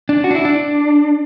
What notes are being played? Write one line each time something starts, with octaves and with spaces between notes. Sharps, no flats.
D4
F#4
D4
E4
D4